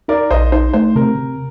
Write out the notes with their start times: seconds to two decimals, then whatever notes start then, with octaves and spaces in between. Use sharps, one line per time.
0.08 D#4 A#4 D5
0.31 A#1 C5 D#5
0.52 D#4 C5
0.74 A3 C5
0.96 C3 A#4
1.17 C3